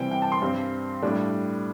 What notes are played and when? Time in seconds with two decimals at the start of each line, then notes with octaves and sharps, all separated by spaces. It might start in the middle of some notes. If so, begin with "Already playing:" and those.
Already playing: C3 E3 G3 C4 G5
0.11 G5
0.22 A5
0.32 C6
0.42 G2 G3 C4
1.02 A2 G3 D4